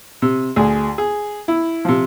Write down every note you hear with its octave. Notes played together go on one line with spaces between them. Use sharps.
C3
D2 G#4
G#4
E4
C3 F3